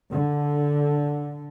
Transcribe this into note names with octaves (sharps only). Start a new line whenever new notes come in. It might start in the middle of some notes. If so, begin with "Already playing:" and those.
D3